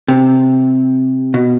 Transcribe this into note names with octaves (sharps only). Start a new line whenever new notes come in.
C3
B2